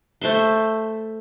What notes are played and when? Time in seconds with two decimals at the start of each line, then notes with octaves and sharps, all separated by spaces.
0.22 A3 C5 E5 C6